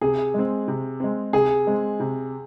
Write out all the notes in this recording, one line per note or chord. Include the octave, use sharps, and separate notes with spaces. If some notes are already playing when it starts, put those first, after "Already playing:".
C3 G#4
G#3 C4
C3
G#3 C4
C3 G#4
G#3 C4
C3